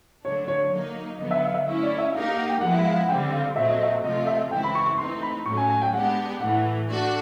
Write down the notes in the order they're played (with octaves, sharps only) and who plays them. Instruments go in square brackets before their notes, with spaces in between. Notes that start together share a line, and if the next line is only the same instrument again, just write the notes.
[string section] D3 F#3 A3 D4 [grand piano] C#5
[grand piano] C#5
[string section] F#3 A#3 D#4
[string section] D3 F#3 B3 [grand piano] D#5
[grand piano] E5
F5
E5
[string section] A3 C#4 E4
[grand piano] D5
E5
[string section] A#3 D#4 G4 A#4 [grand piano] F5
[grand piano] F5
F#5
G5
[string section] F3 G#3 B3 E4 [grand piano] F#5
[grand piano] F#5
F5
F#5
[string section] D3 G3 C4 [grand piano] G5
[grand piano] F5
[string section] A#2 F#3 A3 C4 [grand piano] E5
[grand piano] D#5
E5
[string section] C3 F3 A3 C4 F4 [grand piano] D#5
[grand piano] E5
[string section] C#3 E3 G#3 C4 E4 [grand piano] G5
[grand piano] B5
C#6
C#6
[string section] E3 A3 C4 D#4 [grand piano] C6
[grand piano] B5
[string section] A2 F#3 A3 C#4 [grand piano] C#6
[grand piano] G#5
G#5
G5
[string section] G#3 B3 D4 G4 [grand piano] F#5
[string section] A2 E3 A3 [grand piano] F#5
[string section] A3 D4 F#4